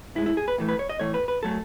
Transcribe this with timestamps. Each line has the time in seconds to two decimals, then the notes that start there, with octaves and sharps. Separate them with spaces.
0.15 A2 G#3 E4
0.26 E4
0.37 G#4
0.48 B4
0.58 A2 E3 A3
0.68 B4
0.79 C#5
0.89 D#5
1.00 A2 E3 A3 C#5
1.14 B4
1.28 B4
1.43 F#3 A3 A4